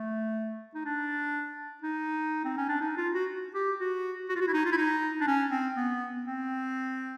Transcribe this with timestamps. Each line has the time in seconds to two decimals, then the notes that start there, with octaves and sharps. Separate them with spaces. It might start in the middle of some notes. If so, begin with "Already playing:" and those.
Already playing: A3
0.75 D#4
0.85 D4
1.82 D#4
2.45 C4
2.57 C#4
2.69 D4
2.81 D#4
2.97 F4
3.14 F#4
3.55 G4
3.80 F#4
4.29 F#4
4.36 F4
4.41 F#4
4.48 E4
4.53 D#4
4.65 F4
4.72 E4
4.77 D#4
5.21 D4
5.27 C#4
5.51 C4
5.77 B3
6.25 C4